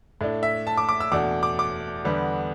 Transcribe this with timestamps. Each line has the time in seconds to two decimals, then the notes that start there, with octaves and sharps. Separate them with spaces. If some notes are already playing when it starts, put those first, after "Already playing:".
0.21 A2 A3 D4
0.43 E5
0.67 A5
0.78 D6
0.89 D6
1.00 E6
1.12 E2 B2 A3 D4 D6
1.43 D6
1.59 D6
2.04 E2 D3 G3 B3